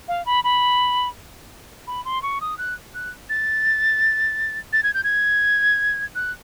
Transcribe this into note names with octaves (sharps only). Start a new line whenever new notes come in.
F5
B5
B5
B5
C6
C#6
D#6
F#6
F#6
A6
A6
G#6
G6
G#6
F#6